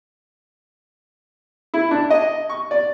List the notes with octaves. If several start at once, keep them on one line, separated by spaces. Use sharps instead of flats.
E4
D4
D#5
C#6
D5